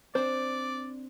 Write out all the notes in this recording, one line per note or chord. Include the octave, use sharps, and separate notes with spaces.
C4 D4 C5 D5